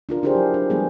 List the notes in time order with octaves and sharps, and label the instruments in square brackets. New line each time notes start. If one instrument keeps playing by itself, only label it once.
[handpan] D4 F4 A#4
D4 E4 G4 G#4 A#4 C5
F#3
D4
F3 G3 G#3 B3 D4 G#4